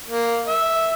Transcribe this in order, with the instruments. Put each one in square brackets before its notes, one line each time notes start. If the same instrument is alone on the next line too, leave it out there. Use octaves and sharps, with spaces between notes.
[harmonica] A#3
E5